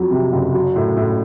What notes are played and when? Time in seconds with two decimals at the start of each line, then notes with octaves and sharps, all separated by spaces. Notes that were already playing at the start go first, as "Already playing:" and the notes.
Already playing: F2 F#3
0.11 C3
0.33 F#1
0.54 F#3
0.76 A2
0.97 A2